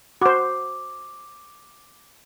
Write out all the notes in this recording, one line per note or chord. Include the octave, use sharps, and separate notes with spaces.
F#4 C5 D6